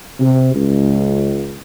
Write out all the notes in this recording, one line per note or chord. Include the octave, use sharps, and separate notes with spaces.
C3
C#2